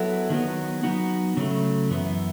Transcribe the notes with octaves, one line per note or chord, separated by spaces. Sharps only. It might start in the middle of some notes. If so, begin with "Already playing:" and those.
Already playing: F#3 B3 E4 A4
D#3 F#3 B3
F#3 B3 D#4 F#4
C#3 F#3 A3
F#2 E3 B3